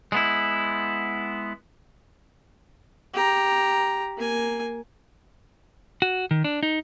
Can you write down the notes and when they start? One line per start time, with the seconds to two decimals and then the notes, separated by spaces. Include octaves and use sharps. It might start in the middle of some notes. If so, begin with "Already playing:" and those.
0.12 G#3 B3 E4
3.14 G4 A#5
4.17 A#3 G#5
6.02 F#4
6.31 D#3
6.44 D4
6.63 D#4